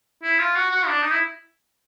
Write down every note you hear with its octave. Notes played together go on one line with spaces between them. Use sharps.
E4
F4
F#4
F#4
D4
D#4
E4